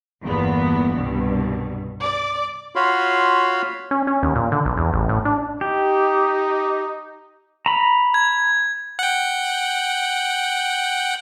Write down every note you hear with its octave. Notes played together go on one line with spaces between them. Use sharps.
G1 E2 A#2 B3
C2 G2 B2
D5 D6
F4 F#4 C#5 F5 B5 C6
C#4
C#4
D#2
A#2
D3
B1
E2
A1
A2
D4
D#4 G4
A#5 B5
G#6
F#5 G5